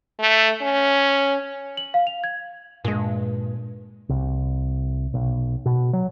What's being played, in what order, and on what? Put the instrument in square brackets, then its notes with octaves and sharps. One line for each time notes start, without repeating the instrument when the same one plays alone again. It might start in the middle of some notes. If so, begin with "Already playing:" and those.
[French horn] A3
C#4
[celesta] F#7
F5
F7
G#6
[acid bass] G2 [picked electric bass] A#2 G#3
[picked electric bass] C2
B1
B2
F#3